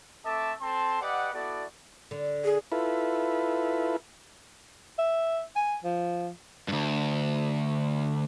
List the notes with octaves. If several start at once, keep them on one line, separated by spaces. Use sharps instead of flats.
A3 C4 A4 E5 A5 D6
C4 A4 A5 C6
G4 B4 D5 D#5 F#5
B3 E4 F#4 A4 D5
D3
G#4
E4 F4 A4 B4
E5
G#5
F3
D2 G2